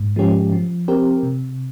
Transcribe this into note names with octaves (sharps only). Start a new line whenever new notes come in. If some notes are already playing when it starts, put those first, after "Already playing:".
Already playing: G#2
F3 G#3 C#4 G4
F3
C4 G4 A#4
C3